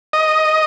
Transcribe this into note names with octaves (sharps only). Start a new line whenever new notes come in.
D#5